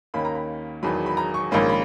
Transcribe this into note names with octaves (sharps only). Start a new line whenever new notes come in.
D#2 D#3 A#3 C#4 B5
A#5
B5
E1 E2 D#3 F#3 B5
B5
A#5
C#6
A#1 G#2 D#3 A#3 C#4 B5
B5